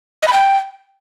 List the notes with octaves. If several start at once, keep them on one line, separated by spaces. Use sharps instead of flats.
D#5
B5
G5